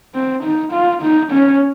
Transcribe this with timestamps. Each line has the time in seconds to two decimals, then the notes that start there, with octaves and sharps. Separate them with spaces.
0.15 C4
0.44 D#4
0.73 F4
1.02 D#4
1.32 C#4